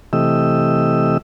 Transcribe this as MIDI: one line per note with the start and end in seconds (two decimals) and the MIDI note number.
0.13 1.18 48
0.13 1.18 52
0.13 1.18 57
0.13 1.18 67
0.13 1.18 75
0.13 1.18 88